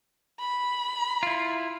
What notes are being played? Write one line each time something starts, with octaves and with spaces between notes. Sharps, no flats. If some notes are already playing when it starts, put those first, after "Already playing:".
B5
E4 F4